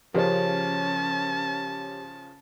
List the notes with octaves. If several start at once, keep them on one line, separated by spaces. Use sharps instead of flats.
C#3 F3 C#4 G4 A#4 C5 C#5 A5